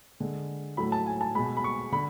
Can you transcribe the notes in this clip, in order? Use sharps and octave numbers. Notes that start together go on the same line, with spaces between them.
D3 G#3
A2 F#3 A3 B5
A5
G#5
A5
B2 G#3 B5
B5
C#6
D3 B5